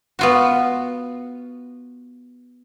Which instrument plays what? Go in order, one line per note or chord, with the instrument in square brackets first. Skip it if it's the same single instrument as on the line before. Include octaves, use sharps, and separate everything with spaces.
[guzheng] B3 F4 F#4